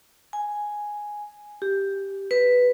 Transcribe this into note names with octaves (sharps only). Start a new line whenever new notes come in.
G#5
G4
B4